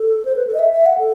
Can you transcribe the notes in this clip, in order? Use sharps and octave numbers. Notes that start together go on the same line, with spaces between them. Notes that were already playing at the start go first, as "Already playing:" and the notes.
Already playing: A4
C5
B4
A4
D#5
E5
E5
F#5
A4